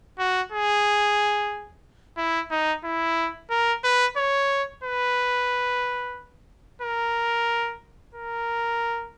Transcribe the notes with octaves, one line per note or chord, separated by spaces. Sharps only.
F#4
G#4
E4
D#4
E4
A#4
B4
C#5
B4
A#4
A#4